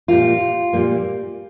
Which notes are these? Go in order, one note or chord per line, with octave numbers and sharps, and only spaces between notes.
A#2 G3 A#3 F4
A#2 G3 A#3